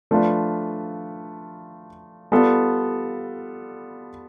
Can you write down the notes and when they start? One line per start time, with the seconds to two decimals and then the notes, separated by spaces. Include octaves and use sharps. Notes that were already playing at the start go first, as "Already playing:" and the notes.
0.11 F3 A3 D4 F4 B4
2.32 G3 B3 F4 A4